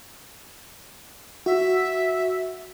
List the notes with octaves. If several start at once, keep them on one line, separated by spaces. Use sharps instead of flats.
F#4 E5